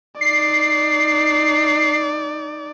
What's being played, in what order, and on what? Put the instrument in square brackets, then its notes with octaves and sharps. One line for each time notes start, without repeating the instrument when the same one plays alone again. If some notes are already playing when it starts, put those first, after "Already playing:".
[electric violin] D#4 D5 [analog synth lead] C7